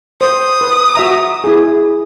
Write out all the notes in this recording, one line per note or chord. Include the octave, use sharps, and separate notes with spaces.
C5 D#6
B4
F#4 E5 A#5
E4 G#4